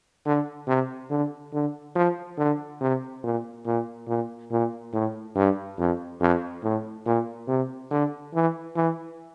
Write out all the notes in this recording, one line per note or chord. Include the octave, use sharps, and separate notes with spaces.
D3
C3
D3
D3
F3
D3
C3
A#2
A#2
A#2
A#2
A2
G2
F2
F2
A2
A#2
C3
D3
E3
E3